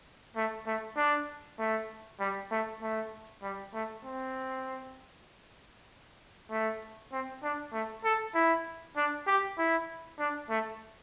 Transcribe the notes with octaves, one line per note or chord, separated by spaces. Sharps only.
A3
A3
D4
A3
G3
A3
A3
G3
A3
C4
A3
C4
D4
A3
A4
E4
D4
G4
E4
D4
A3